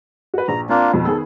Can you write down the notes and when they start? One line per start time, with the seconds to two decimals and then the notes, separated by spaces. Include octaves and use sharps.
0.34 F#4 B4
0.48 A#1 A#5
0.69 A#3 C4 D4 F4
0.93 F2 B2 F3
1.05 D#3 B3 G#4 A4